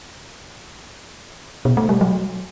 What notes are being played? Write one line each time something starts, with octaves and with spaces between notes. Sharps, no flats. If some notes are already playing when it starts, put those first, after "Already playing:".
B2
A3
G3
F#3